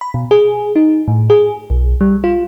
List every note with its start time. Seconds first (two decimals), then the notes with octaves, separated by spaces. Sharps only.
0.01 B5
0.14 B2
0.31 G#4
0.76 D#4
1.08 A2
1.30 G#4
1.70 B1
2.01 G3
2.24 F4